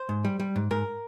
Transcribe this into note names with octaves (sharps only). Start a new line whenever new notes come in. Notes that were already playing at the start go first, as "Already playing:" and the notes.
Already playing: C5
G#2
G3
G3
G#2
G#2 A#4